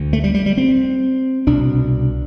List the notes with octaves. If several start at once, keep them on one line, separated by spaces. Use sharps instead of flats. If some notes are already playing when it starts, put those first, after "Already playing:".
Already playing: D2 D3
A3
G3
G3
G3
C4
C2 B2 D4